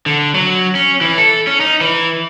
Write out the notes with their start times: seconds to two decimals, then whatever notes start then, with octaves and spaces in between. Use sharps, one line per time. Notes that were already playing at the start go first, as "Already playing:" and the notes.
0.06 D3
0.34 F#3
0.75 C#4
1.01 E3
1.18 A4
1.47 C#4
1.60 D#4
1.81 E3